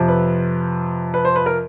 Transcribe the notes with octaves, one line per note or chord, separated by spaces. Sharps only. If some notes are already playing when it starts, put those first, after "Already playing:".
Already playing: F2 C3 F3
B4
B4
C5
B4
A#4